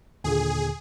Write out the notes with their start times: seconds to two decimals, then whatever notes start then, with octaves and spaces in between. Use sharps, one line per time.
0.24 D#2 A#2 D3 G#4